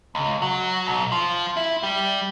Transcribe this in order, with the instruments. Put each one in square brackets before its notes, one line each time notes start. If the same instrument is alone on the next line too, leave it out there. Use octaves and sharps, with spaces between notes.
[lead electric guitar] C#2
F#3
B1
F3
E4
G3